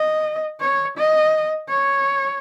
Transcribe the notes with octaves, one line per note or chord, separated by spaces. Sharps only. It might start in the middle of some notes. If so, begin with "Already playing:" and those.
Already playing: D#5
C#5
D#5
C#5